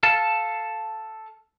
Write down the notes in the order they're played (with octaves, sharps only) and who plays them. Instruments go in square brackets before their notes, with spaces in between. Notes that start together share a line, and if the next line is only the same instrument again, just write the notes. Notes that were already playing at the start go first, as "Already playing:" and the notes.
[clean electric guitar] A4 F5 A5